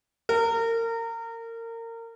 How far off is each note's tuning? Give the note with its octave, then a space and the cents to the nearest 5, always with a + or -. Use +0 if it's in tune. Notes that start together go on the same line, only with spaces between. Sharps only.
A#4 -30